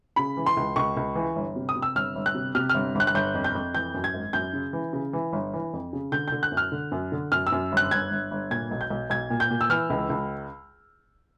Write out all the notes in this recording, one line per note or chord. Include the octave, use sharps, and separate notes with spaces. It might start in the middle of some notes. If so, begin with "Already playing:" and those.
C#3 B5
E3
C6
C#2
C#2 C#6
C#2
E3
G1
C3
D#6
C3
E6
G1 F6
G1
F#6
C3
C3 F6
G1 F6
G1 F#6
F#6
G1 G6
F2
G6
F2
E3 G6
F#2
G#6
G#1
F#2 G6
C#3
E3
C#3
E3
G1
E3
F2
C#3
D3 G6
D3 G6
F#6
F#2
F6
D3
F#2
D3
F#2 F6
E6
F#2
G1 F#6
G1 G#6
G1
G1
A#2 G#6
B1
G6
B1
B1 G#6
A#2
G6
A#2
E6
E3 F6
C#2
C#2